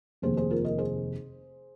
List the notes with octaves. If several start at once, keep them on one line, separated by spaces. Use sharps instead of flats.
F1 D#2 D#3 G#4 C5
G#4 C5
F4 A#4
A#4 D#5
G#4 C5